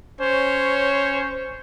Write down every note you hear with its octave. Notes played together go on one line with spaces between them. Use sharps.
C#4 C5 C#5